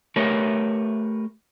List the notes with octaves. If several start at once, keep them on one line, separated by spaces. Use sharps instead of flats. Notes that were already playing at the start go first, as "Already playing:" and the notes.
A3 G4 A#4 B4 C#5 A5